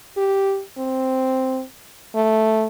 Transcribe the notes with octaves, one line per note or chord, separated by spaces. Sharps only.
G4
C4
A3